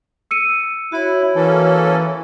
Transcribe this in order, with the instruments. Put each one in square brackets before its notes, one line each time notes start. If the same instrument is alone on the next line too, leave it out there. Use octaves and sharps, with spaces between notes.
[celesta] E6 C#7 D#7
[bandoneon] E4 [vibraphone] F#4 C#5
[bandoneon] E3 [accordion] A#3 C#4 A4